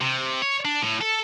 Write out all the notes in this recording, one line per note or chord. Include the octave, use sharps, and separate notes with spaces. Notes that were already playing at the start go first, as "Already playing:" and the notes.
C3
C#5
D4
A2
A4